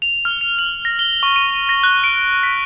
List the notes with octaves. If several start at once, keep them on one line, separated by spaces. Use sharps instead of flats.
F7
F6
F7
F#7
A#6
G7
C#6
D#7
A#6
F#6
D7
B6